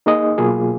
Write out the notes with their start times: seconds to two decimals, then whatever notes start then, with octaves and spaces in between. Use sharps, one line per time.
0.06 A#3 D#4 G#4 D#5
0.38 B2 F#3 A#3 F4 G#4